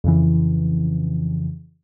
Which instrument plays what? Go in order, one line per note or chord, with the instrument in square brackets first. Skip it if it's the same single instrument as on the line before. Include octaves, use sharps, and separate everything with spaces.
[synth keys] F2 C#3 E3